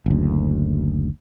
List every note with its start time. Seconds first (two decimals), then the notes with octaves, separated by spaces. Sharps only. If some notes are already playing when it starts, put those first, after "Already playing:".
0.06 F#1 D2